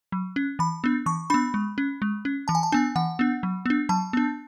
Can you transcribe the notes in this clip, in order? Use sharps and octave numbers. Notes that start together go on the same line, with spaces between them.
F#3
C#4
E3 B5
B3 D4
E3 C#6
B3 D4 B5
G#3
C#4
G#3
C#4
E3 A5
G#5
A5
B3 D4 G#5
E3 F#5
B3 D4
F#3
B3 D4
F#3 A5
B3 D4